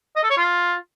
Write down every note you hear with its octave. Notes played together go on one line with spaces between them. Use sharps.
D#5
A4
C#5
F4